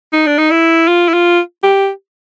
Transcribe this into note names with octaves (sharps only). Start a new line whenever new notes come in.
D#4
D4
D#4
E4
F4
E4
F4
G4